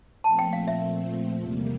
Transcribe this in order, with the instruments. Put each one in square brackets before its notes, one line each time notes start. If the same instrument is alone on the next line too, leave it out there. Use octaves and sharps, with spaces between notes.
[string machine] A#2 F3 A3 C4 [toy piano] A5
[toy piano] G5
F5
E5
[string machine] E2 C3 G3 A#3